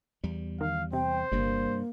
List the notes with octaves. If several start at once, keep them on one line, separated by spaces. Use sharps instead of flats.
E2 G3
D#3 F5
C3 C5 G5
G1 G2 C3 G3 A#3